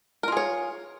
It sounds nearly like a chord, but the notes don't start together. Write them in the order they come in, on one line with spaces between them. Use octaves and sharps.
A#4 F4 G#4 C#5